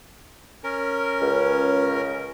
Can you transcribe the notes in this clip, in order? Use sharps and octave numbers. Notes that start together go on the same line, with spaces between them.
C#4 A#4
C#2